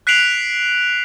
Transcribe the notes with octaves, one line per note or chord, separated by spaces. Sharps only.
F#6 B6 C7 D7 F7 F#7